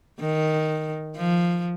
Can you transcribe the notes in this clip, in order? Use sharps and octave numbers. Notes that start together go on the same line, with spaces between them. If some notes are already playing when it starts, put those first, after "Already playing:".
D#3
F3